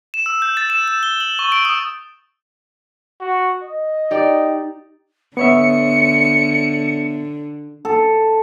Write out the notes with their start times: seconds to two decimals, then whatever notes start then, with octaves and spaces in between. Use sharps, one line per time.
0.14 E7
0.26 E6
0.42 G6
0.57 A6
0.70 E7
0.88 E7
1.03 G7
1.20 F#7
1.39 C#6
1.52 D7
1.65 D#6
3.20 F#4
3.62 D#5
4.11 D#4 G4 D5
5.37 D3 B3 C#5 E5 C#7
7.85 A4